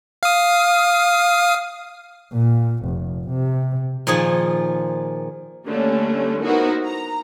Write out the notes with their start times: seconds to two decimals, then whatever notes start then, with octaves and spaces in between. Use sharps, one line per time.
0.23 F5 D#6
2.33 A#2
2.85 F1
3.30 C3
4.07 A#2 D#3 F3 G#4 G#5
5.66 D3 G3 A3 A#3 C#4
6.42 B3 D#4 E4 F#4 A#4 C5
6.85 A#5